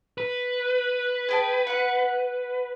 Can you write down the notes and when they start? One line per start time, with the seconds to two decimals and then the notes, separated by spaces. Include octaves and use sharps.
0.18 B4
1.29 G#4 G5 A5
1.67 F#5 B5